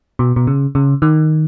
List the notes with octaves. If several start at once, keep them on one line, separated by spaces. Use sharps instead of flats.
B2
B2
C#3
C#3
D#3